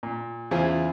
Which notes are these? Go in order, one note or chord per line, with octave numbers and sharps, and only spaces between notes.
A#2
E2 C#3 E4 F4 C5 G#5